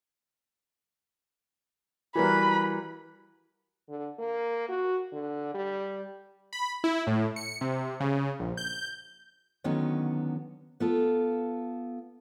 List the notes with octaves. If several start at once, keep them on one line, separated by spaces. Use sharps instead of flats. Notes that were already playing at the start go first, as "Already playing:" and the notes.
E3 G3 F#4 A#4 B4 B5
D3
A#3
F#4
D3
G3
B5
E4
A2
C#7
C3
C#3
A#1
G6
D3 D#3 F#3 B3 C#4
B3 F4 A4